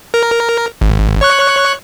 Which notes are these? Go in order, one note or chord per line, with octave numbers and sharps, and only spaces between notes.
A#4
G#1
C#5 C#6 F#6